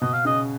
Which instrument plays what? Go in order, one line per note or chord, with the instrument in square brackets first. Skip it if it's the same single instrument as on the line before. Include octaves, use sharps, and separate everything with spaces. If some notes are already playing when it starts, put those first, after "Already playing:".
[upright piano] B2 [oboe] D#5
[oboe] F5
[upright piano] C#3 [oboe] D#5